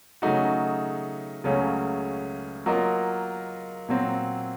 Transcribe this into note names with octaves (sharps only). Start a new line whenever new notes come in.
C#3 F#3 A3 D#4 F#4
C#2 C#3 F#3 A3 C#4
F#3 A#3 F4 A#4 D#5
A#2 F#3 C4